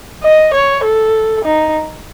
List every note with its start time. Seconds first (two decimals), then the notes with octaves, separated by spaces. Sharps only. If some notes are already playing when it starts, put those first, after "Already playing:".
0.23 D#5
0.53 C#5
0.84 A4
1.44 D#4